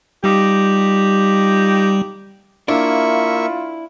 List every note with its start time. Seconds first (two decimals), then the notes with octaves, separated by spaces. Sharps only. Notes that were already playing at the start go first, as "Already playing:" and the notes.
0.24 G3 D#4 F4 G4
2.68 A#3 D4 E4 F4 E5 C#6